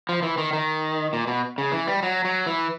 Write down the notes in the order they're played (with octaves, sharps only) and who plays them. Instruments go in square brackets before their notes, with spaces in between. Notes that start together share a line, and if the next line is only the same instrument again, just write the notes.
[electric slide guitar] F3
E3
D#3
D#3
A#2
B2
C#3
E3
G3
F#3
F#3
E3